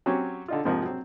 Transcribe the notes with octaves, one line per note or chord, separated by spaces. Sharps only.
F#3 C4 C#4 G4
D3 D#4 F4
F2 G#2 C3 F3 A#3
F#3 C4